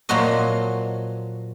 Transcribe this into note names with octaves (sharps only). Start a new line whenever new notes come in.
A#2 F3 F#3 F#4 D#5